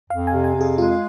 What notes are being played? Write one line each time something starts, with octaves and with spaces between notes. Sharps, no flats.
F2 F5
G#5
C3
G#5
F2
G#4
G#3 F4